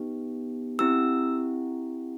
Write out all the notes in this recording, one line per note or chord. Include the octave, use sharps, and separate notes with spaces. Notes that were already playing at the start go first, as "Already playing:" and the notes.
Already playing: B3 D#4 G4
C4 E4 G4 E6